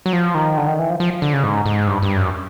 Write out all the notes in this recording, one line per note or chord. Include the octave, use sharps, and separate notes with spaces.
F#3
F3
D#3
D3
D#3
E3
F3
F3
D3
C#3
G#2
G#2
G2
G2
F#2